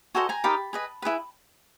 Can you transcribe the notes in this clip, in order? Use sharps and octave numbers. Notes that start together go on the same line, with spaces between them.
F#4 A4 C5 D#5 G#5 A#5
G#5 A#5
D#4 G4 A#4 A5 B5
G#4 B4 D#5
E4 G#4 B4